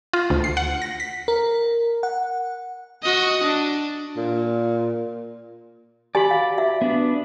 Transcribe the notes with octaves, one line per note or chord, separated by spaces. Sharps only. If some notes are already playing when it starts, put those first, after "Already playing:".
F4
D2
C7
F#5
A#6
B6
A#4
F#5
F#4 D#5
D4
A#2
F#4 G4 D5 G#5 B5
F5
F#4 E5
B3 D4